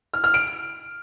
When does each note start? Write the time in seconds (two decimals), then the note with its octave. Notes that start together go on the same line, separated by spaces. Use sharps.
0.14 F6
0.24 F6
0.34 D7